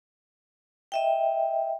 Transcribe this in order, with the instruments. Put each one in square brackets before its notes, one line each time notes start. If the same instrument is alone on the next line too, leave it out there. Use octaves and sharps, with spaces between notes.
[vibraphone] D#5 E5 G5